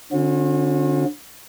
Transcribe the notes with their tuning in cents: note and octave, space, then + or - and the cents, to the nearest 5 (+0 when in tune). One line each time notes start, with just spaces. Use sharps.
D3 +0 C#4 -40 F#4 -45